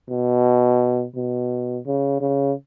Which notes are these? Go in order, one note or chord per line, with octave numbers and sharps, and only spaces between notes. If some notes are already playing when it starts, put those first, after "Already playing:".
B2
B2
C#3
C#3